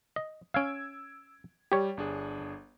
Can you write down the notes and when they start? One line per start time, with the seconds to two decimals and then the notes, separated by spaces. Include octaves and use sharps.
0.16 D#5
0.54 C#4 F5 E6 G#6 D7
1.72 G3 G4 C#5
1.97 G1 D4 G#4